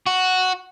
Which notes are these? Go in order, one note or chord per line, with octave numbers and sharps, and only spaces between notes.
F#4